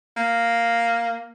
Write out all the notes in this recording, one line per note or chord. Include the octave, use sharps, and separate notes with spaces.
A#3